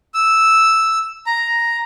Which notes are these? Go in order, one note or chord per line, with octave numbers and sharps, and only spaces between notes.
E6
A#5